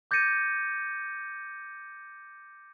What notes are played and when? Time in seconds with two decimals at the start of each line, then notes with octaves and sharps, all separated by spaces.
0.11 D6 G6 A6 A#6 C#7 D#7